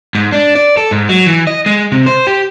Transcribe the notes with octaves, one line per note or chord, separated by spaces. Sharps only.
G#2
D4
D5
A4
G#2
F#3
E3
D#5
G#3
C3
C5
G4